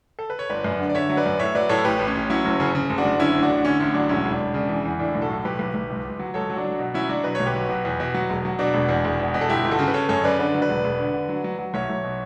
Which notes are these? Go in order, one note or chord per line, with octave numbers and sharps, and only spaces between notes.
A4
B4
C#5
G1 B4 D5
F#2
D3
D5
D3 C#5 E5
F#3
B4 D5
F#2
A2 C#5 E5
F#3 B4 D5
A2 A4 C#5
A1 G4 B4
A1
C#4
A1
F#3 C#4 E4
F#1
C#3
C#3
F#1
D4 F#4
F#1
D3 C#4 E4
A1
D4 F#4
D3
D3 C#4 E4
A1 C#4 E4
F#3 D4
E1 C#4 E4
E1
D4
E1
C#3 D4
E3
E2
A2 D4
B1
F#4 A4
A2
B1 G4 B4
B1
B1
C#2
C#2
F#3
C#2 A4 C#5
F#3
D4 F#4
F#3
B2
F#3 C#4 E4
F#3 D4 F#4
B2 B4
B1 C#5
G4 B4
F#3
B2
E2
B2
F#3
E1
F#3
B2 D4 F#4
E1
E2
E1
E2
B2
A4
G1 E4 G4
G1
F#4 A4
C#3
B4
C#3 A4 C#5
F#2 A4 C#5
C#3 B4 D5
D3 B4 D5
F#3
B4 D5
E1
E1
D3
D3
F#3
F#3
F#3
B1 C#5 E5
B1
B2